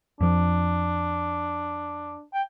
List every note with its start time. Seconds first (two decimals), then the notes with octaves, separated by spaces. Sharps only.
0.21 F2 F3 D4
2.34 G5